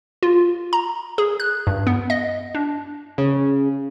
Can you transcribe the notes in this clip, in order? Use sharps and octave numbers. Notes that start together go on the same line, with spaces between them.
F4
A#5
G#4
F#6
G2
B3
D#5
D4
C#3